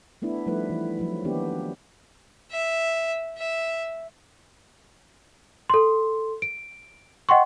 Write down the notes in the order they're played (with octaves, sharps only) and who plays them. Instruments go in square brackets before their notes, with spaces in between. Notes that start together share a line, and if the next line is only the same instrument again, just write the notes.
[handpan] A3 B3 D4 E4
F3 G3 A3 D#4 E4 B4
E3
F3 F#3 E4
D#3 A#3 B3 D4 G4
[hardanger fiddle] E5
E5
[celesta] A4 C6
D7
D#5 F#5 G5 C6 C#6